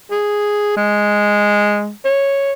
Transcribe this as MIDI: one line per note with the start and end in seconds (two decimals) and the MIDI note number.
0.11 0.74 68
0.77 1.92 56
2.05 2.53 73